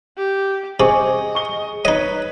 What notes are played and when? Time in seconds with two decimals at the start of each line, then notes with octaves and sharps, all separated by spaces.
0.17 G4
0.80 C3 G#4 D#5 G#5 C#6 D6
1.35 C#6 G7
1.85 D#4 B4 C#5 D#5